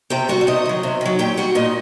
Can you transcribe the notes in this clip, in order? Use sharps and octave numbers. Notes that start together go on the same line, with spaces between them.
C3 G4 G5
G3 F#4 F#5
D5
C3 D#4 D#5
D#3 F#3
C3
D#3
F#3
A#2 G4 G5
G3 F#4 F#5
A#2 D#4 D#5